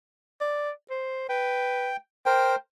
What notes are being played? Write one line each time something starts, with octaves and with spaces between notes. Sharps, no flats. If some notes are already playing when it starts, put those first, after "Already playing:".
D5
C5
B4 G5
A#4 C5 G5